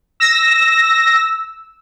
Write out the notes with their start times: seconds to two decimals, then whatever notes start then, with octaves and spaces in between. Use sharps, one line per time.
0.20 E6 A#6